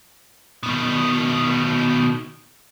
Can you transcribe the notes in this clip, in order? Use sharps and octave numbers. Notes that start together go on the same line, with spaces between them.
B2 D#3